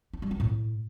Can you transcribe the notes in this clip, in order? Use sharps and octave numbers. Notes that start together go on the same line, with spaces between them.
D#4
G3
C4
A2